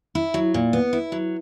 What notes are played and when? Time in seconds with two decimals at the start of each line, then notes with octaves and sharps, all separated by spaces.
0.15 E4
0.34 F#3
0.54 A#2
0.73 B3
0.93 E4
1.12 F#3